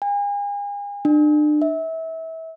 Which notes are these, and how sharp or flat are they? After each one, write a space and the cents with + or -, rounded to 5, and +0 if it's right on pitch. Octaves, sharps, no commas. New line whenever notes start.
G#5 -40
D4 +35
E5 -25